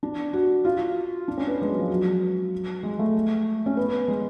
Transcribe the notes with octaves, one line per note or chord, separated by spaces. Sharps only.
D4
F#4
F4
D4
C#4
B3
G#3
F#3
F3
F#3
G#3
A3
C#4
B3
G#3